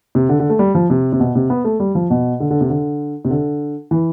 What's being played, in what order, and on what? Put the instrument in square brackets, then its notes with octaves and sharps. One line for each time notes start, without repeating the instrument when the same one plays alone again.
[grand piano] C3
D3
D3
A3
G3
F3
C3
C3
B2
C3
B3
A3
G3
F3
B2
D3
D3
C3
D3
C3
D3
E3